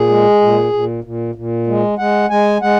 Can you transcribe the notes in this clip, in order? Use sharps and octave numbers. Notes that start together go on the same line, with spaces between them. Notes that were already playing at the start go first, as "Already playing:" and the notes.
Already playing: A#2 G#4
G#3
A#2
A#2
A#2
A#2
G#3
G#3 F#5
G#3 G#5
G#3 F#5